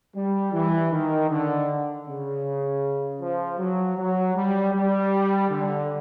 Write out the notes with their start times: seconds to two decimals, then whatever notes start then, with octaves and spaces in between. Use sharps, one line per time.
0.15 G3
0.53 E3
0.91 D#3
1.30 D3
2.06 C#3
3.21 F3
3.58 F#3
3.97 F#3
4.36 G3
4.73 G3
5.49 D3